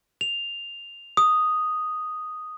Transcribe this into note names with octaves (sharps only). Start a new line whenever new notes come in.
F7
D#6